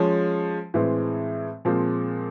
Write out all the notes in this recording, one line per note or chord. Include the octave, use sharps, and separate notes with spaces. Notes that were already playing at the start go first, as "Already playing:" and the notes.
Already playing: F3 G#3 C#4
A2 E3 G#3 C4
A#2 F3 G#3 C4